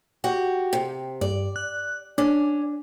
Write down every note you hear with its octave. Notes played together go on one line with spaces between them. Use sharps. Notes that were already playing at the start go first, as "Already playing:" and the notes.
F#4 G4
C3
G2 D5
F#6
C#4 D4